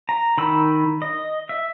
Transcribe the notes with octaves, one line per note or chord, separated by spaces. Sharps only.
A#5
D#3 B5 E6
D#5
E5